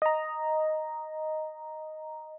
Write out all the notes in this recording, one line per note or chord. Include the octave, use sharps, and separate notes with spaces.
D#5 A#5